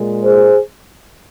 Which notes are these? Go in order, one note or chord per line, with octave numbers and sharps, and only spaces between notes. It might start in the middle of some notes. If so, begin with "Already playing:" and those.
Already playing: A#2 G#3
G#4 C5